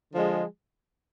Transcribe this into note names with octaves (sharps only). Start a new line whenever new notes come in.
D3 F3 G#3